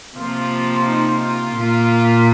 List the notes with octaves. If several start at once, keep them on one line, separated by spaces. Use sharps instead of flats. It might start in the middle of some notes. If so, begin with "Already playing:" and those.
C3 F3 A#3 F4
D#4
F4
A#2 A#3